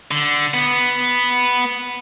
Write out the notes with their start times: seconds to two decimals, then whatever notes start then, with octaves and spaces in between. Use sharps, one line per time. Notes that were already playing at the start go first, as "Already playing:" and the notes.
0.11 D3
0.54 B3